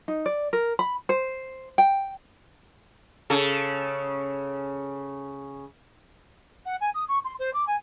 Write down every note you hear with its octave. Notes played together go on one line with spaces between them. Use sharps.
D#4
D5
A#4
B5
C5
G5
C#3 A4
F#5
G#5
D#6
C#6
C6
C5
D6
G#5